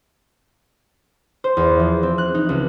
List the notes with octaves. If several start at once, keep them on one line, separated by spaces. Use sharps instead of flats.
C5
E2
F3
C4
F#6
D#4
C#2